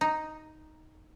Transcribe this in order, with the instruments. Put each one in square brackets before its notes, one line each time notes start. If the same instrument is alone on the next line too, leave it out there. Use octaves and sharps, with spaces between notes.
[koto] D#4